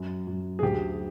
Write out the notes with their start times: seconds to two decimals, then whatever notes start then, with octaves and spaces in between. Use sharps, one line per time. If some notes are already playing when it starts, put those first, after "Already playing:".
Already playing: F#2
0.27 F#2
0.59 G#4
0.62 D2 G4